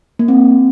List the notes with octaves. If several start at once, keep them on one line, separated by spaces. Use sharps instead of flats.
A#3
C4